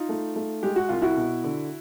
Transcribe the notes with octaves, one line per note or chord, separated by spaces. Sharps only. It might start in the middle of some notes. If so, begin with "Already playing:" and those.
Already playing: D#4 F4
A3
A3
G#3 G4
F#4
C2 F4
E4 F#4
B2
D3